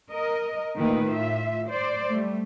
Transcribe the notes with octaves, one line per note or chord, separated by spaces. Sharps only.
A#4 D#5
A#2 D#3 A3 A#3 B4
A2 F4 E5
C5 D5
G3 A3